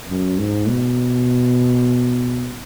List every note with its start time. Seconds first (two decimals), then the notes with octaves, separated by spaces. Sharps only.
0.09 F#2
0.39 G#2
0.68 B2